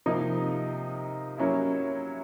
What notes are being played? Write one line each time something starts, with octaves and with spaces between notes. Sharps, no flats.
C3 F3 A#3 D#4
F#3 A#3 C#4 E4